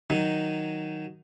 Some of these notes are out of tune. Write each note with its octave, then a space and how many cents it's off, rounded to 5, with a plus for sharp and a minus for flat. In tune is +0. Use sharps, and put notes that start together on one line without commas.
D#3 +0 F#3 +0 D#4 +0